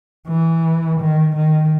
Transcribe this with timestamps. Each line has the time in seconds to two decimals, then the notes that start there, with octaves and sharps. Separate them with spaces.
0.28 E3
1.01 D#3
1.36 D#3